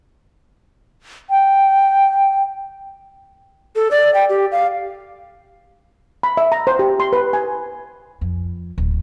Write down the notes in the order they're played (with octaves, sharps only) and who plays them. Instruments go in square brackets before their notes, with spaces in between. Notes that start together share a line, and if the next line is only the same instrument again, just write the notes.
[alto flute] G5
[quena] A4
D5
G5
G4
F5
[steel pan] B5
E5
A#5
C5
G4
C6
B4
G#5
[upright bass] F2
D1